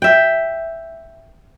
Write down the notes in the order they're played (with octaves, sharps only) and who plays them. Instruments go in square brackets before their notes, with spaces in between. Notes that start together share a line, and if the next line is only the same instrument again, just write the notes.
[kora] E5 G5